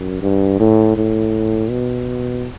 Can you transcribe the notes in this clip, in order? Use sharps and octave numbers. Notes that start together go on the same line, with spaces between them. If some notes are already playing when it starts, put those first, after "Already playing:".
Already playing: F#2
G2
A2
A2
B2